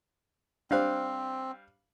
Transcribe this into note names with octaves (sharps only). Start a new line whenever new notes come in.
G3 C4 D4 C5 F5 F#6